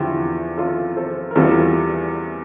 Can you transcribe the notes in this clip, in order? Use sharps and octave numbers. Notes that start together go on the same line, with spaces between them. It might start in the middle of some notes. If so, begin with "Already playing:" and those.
Already playing: E2 D3 F3 E4 G4
F4 A4
A4 C5
A#4
E2 E3 G3 F4 A4